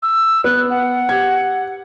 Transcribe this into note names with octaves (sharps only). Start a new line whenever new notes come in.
E6
B3 F#6
F#5
G4 G#6